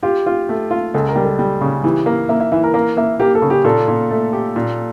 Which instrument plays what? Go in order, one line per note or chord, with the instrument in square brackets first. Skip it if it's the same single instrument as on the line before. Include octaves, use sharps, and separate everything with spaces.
[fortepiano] F4 [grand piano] G4
[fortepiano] F4
A3
F4
[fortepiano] C#2 [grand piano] A4
[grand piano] A#4
[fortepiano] G3
[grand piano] A4
[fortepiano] G3
C#3
[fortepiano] E3 [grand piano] G4
[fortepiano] A#3
[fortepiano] A#3 [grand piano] E5
[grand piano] E5
[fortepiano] E3 [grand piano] E5
[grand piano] A#4
[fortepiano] A#3 [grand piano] A#4
[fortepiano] A#3 [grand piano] E5
[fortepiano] A#3 [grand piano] G4
[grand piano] A4
[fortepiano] C#3
[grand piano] G4
[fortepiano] A#2 [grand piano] A4
[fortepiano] A#2
A3
G4
A#2